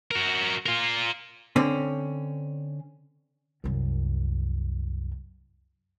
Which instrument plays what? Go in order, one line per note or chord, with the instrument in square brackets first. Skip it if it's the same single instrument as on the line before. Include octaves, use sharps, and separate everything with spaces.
[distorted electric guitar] F#4 A#4
F4 A#4
[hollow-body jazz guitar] D3 C4 C#4
[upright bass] C2 F#2